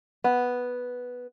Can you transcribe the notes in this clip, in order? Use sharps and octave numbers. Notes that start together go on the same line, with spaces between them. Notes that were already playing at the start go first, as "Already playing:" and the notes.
B3